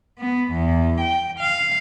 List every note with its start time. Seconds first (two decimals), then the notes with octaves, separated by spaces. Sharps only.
0.19 B3
0.51 E2
1.01 G5
1.39 F5